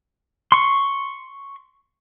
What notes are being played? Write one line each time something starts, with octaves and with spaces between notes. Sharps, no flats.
C6 C#6